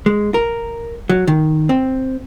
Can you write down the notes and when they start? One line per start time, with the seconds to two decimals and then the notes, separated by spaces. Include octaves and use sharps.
0.06 G#3
0.34 A#4
1.09 F#3
1.27 D#3
1.69 C4